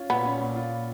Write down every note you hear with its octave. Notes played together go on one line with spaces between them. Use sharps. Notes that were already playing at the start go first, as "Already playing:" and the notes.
Already playing: C#4 F4
A#2 B3
C#4
A#2
F4